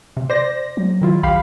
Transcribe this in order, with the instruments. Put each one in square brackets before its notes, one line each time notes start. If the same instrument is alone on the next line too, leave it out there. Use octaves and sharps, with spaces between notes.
[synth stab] C3
C5 D5 A#6
[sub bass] F#3
[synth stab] D#3 E4 F4
[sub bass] A#1 [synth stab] G4 F5 B5